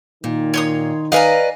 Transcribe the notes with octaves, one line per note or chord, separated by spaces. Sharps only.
A#2 D#3
C#5 C6 D#6
B4 D5 D#5 F5 G#5 A#5